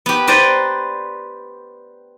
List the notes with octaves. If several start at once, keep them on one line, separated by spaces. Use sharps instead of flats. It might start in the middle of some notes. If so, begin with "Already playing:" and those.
B3 G4
B4 C5 D5 G5 A#5